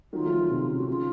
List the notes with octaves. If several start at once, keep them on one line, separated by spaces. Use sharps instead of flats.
D#3 F#3 F4
F3 A3
D#3 F#3
C3 D#3
C#3
F#4
C#3 F4